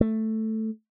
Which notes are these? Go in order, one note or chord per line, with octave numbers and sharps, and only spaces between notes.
A3